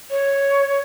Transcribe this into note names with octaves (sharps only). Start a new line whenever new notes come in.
C#5